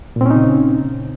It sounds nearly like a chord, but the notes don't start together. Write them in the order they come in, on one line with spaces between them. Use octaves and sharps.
A#2 C4 C#4 D#4 C#3